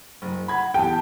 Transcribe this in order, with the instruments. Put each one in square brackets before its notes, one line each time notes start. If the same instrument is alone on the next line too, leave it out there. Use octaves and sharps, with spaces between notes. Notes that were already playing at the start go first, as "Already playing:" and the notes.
[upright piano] F#1
[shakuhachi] F#5 [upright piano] B5 G#6
[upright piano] E2 G4 [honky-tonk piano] G5 [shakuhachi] A5